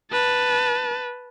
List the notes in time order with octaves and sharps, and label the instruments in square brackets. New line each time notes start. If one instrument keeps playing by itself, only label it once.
[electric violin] B4 A5